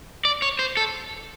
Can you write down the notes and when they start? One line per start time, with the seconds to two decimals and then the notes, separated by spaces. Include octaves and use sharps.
0.25 D5
0.42 C#5
0.59 C5
0.77 A4